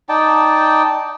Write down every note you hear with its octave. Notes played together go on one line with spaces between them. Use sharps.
D#4 D5 G5 A5